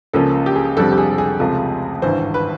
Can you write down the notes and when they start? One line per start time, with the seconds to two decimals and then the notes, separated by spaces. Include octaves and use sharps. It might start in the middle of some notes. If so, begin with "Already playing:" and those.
0.13 C#2 C#3 F3 A#3 C#4 A4
0.46 G4
0.55 G#4
0.77 F1 F2 D3 G3 C4 A4
0.92 G4
0.98 G#4
1.18 G#4
1.40 C#2 C3 F3 A3
2.02 G#1 G2 E3 C5
2.34 B4